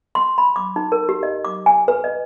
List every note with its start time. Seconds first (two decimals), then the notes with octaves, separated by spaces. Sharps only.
0.15 C6
0.38 B5
0.56 D6
0.76 D#4
0.92 A#4
1.09 G4
1.23 D#5
1.45 D6
1.66 G#5
1.88 B4
2.04 D#5